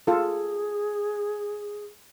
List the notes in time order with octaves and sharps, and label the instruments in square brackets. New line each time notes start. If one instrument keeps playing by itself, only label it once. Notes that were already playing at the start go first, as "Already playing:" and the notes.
[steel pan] F4 A4 [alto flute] G#4